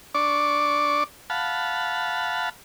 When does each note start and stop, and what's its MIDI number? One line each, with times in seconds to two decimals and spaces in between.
0.15 1.04 62
0.15 1.04 74
0.15 1.04 85
0.15 1.04 86
1.30 2.49 77
1.30 2.49 78
1.30 2.49 81
1.30 2.49 83